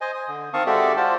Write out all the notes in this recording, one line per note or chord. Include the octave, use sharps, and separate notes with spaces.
C5 D#5 G#5
D#6
D3
D#3 C4 F5 A5 C#6 D#6
G#3 F#4 G4 A4 D5 E5
F4 F#4 C5 D5 A5